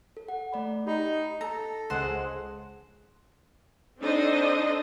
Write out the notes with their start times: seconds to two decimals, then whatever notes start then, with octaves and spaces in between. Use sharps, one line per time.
0.17 A4
0.28 F#5
0.53 A3 D5 B5
0.87 D#4 G4 B5
1.41 A4 A#5
1.90 C#2 G#3 C5 F#5
4.00 C4 D4 D#4 A4 C5 D#5